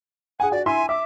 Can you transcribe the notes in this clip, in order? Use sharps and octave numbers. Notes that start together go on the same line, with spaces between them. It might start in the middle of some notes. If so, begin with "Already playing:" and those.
G#4 F#5 G#5
F#4 D5
E4 E5 G#5 C6
E5 D6